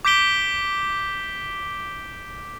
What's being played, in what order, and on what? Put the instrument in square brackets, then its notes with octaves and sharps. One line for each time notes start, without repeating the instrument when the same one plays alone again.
[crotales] D6 G6 B6 D7 G7